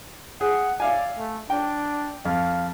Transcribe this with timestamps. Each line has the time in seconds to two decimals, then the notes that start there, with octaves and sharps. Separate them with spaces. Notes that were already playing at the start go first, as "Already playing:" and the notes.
0.41 G#4 F#5
0.80 D5 E5 F5 G#5
1.18 A3
1.50 D4 G5
2.25 F2 F5